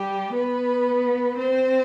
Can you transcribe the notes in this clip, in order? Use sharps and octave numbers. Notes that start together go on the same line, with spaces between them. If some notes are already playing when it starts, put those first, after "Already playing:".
Already playing: G3 G4
B3 B4
C4 C5